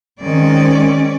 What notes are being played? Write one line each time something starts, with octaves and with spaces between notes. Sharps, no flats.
D#3 G#3 C4 C#4 D5